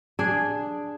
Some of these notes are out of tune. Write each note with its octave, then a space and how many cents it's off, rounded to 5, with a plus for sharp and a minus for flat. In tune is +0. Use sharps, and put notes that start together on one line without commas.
D4 +0 G#4 +0